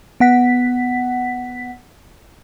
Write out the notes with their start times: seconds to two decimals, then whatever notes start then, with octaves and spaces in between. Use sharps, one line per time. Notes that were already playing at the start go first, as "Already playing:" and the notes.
0.20 B3 F#5 B6